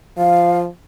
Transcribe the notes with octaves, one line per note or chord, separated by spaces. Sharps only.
F3 F5